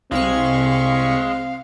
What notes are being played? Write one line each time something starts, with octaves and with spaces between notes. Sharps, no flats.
C2 G#3 C4 F5 B5 C#6